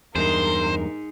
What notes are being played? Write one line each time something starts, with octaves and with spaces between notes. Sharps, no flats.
E2 G2 D#4 G#4 A#4 C5